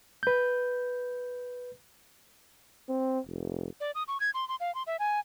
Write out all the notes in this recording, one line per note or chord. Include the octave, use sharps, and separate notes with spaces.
B4 G6
C4
F1
D5
D#6
C#6
G#6
C6
C6
F5
C6
E5
G#5